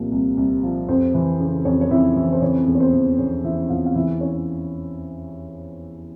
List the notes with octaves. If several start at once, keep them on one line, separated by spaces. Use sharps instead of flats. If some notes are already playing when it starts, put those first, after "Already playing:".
Already playing: C2 A#2 F3 A#3 A#4
C2
C2
F3
F2 C4 C5
E3
C#3
F2 C#4 C#5
C#5
F2 E4 E5
E3 E4 E5
C5
E3 C#4 C#5
E2
C#5
C4 C5
E3
E2 C#4 C#5
E3 E4 E5
E2 F4 F5
F5
E3 E4 E5
C#4 C#5